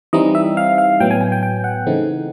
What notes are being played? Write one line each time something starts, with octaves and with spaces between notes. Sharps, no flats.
E3 G3 C4 D#4 D#5
E5
F5
F5
A2 F#3 B3 G5
G#5
G#5
G5
G5
F#5
C#3 E3 A3 C4 D#4